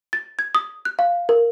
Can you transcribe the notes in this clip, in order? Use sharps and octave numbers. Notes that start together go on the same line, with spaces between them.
A6
G#6
D#6
F#6
F5
A#4